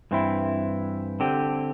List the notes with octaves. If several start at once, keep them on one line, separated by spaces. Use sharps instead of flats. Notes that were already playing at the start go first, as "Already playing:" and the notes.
G2 E3 C4 E4
D3 C4 G4